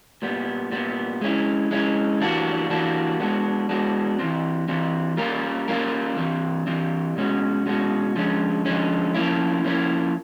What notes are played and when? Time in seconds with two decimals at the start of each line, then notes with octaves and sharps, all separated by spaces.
0.22 A#2 G3 B3
0.71 A#2 G3 B3
1.21 G#3 C#4 E4
1.71 G#3 C#4 E4
2.21 E3 G3 A#3 D4 F#4
2.70 E3 G3 A#3 D4 F#4
3.20 G#3 B3 D4 F#4
3.69 G#3 B3 D4 F#4
4.19 E3 G3 C4
4.68 E3 G3 C4
5.17 G3 A#3 C#4 F4 A#4
5.68 G3 A#3 C#4 F4 A#4
6.17 E3 G3 C4
6.67 E3 G3 C4
7.17 B2 G#3 C#4 F#4
7.66 B2 G#3 C#4 F#4
8.15 D3 F3 G#3 C#4
8.65 D3 F3 G#3 C#4
9.14 F3 A#3 C#4 E4
9.64 F3 A#3 C#4 E4